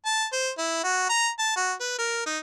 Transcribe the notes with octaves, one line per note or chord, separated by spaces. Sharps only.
A5
C5
E4
F#4
A#5
A5
F#4
B4
A#4
D#4